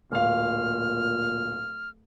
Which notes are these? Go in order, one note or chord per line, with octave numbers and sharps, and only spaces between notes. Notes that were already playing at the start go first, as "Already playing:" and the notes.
D1 A#2 F5 F6